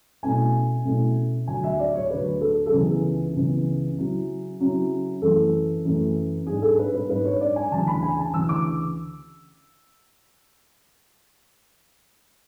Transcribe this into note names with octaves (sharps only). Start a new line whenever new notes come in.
B2 A3 C#4 E4 G#5
B2 A3 C#4 E4
D2 D3 F#3 G#5
E5
D5
C#5
D2 D3 F#3 B4
A4
A4
C#2 C#3 E3 B3 G#4
C#2 C#3 E3 B3
C#3 F#3 C#4 E4
C#3 F#3 C#4 E4
F#2 E3 A3 A4
F#2 E3 A3
G#2 G#3 D4 G#4
A4
B4
B4
G#2 G#3 D4 B4
C#5
D5
G#5
D2 C#3 E3 A5
B5
G#5
A5
D2 C#3 E3 E6
D6